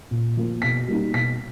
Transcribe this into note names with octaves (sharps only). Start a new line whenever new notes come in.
A#2
F3 A#3
B2 B6
G3 A#3 D#4
B2 B6